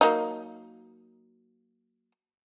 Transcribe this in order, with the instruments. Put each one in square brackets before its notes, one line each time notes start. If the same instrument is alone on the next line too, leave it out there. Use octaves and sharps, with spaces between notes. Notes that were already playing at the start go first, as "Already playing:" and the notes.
[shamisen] F#3 A#3 D#4